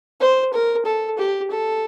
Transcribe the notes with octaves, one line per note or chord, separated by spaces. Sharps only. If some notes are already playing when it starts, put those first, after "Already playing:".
C5
A#4
A4
G4
A4